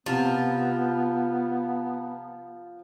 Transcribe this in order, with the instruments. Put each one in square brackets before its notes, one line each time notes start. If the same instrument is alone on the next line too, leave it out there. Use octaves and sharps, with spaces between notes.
[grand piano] C3 [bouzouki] F3 [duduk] B3